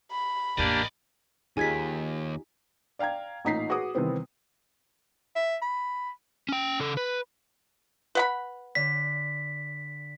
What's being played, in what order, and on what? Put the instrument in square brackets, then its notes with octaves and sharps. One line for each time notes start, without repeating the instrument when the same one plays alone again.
[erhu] B5
[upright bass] A1 E2 [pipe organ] A#3 D4 G4 [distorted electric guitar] D5 D#5
[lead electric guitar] D#2 [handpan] D#4 F4 G4 [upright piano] G#4 [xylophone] G#5 G#6 B6
[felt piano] D5 F5 G5 A#5 G#6
A1 A#2 D#4 A#5 B6 C7
F#4 G#4 B4 D6 D#6
C3 D#3 E3 G3 B3 C4
[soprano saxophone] E5
B5
[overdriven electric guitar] C#4 G5
C#3 A4
B4
[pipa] B4 F#5 B5
[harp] D3 [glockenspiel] B6